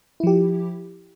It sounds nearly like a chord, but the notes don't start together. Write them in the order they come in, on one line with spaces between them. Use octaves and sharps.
E4 F3 G4